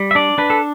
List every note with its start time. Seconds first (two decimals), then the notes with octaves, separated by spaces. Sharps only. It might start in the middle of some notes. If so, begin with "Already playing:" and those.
Already playing: G3
0.11 E5
0.15 D4 D5
0.38 D4 B4
0.50 A4